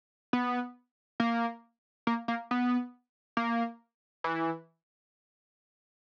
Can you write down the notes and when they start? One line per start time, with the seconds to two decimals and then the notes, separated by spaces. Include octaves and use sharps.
0.33 B3
1.20 A#3
2.07 A#3
2.28 A#3
2.51 B3
3.37 A#3
4.24 E3